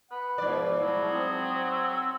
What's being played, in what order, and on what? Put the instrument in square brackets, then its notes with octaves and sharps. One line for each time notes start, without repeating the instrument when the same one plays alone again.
[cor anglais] B4 [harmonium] F#5
[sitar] G#2 D5 [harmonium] B2 F3
[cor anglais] F#3 [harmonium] A3 E4
[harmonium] C4 [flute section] D#6
[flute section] E6